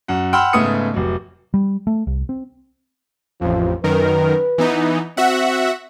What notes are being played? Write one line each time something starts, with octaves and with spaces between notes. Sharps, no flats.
F#2 F#5
F#5 G5 B5 C6 E6 F6
G#2 C#3 A3 B3 D#6 C#7
F1 F#3
G3
A3
C2
C4
A1 F2 F3
F#2 D#3 A#4 B4
E3 B3 D#4
C4 F#4 E5 F#5